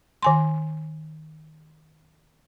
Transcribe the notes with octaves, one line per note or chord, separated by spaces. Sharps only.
D#3 G#5 C6